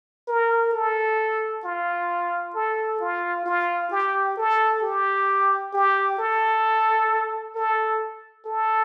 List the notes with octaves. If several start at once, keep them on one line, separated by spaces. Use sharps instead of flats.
A#4
A4
F4
A4
F4
F4
G4
A4
G4
G4
A4
A4
A4